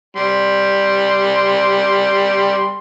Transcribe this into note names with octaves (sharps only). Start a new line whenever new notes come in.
G3 C6